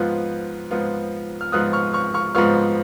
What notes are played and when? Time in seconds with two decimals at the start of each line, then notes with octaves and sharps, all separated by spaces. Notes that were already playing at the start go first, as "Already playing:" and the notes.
Already playing: G#2 F3 B3 F4 F#6
0.71 G#2 F3 B3 F4
1.41 F6
1.52 G#2 F3 B3 F4 D#6 F#6
1.73 C#6 F6
1.93 C#6 F6
2.14 C#6 F6
2.35 G#2 F3 B3 F4 C#6 F6